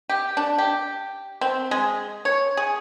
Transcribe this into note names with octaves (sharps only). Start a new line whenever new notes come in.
G4
D4
G4
C4
G#3
C#5
G#4